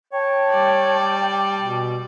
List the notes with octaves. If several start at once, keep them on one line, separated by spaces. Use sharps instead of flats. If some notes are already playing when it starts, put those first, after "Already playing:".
C#5 G5 A5
G3 D5
B2